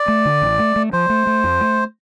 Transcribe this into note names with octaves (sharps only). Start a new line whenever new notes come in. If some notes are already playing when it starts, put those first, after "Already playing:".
Already playing: D5
A3
D3
A1
A3
A3
F3 C5
A3
A3
F2
A3